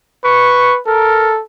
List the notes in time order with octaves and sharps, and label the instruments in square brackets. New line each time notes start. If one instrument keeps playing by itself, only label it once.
[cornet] B4 [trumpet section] C#6
[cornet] A4 [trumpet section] A#4